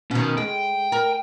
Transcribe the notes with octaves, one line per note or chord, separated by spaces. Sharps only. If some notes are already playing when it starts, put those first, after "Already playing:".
B2 D#3 C#4
G#3 G5
A#4